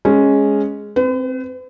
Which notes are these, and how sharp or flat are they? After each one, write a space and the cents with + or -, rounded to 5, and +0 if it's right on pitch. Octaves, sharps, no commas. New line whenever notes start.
G#3 +0 C#4 +0
C4 +0 B4 +45